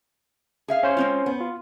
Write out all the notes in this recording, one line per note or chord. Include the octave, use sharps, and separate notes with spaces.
G#4 E5 F5
C#4 C5 C#5
G#3 C4 F4
B3
F4